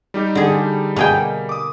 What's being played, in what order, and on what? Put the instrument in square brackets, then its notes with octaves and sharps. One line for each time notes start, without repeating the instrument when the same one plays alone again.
[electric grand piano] G3 D#4 G4
[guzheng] D3 G#4
[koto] B2 G#4 G5 [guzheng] A#3
[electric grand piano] D6 D#6